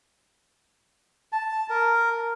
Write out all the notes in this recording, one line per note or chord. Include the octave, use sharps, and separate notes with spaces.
A5
A#4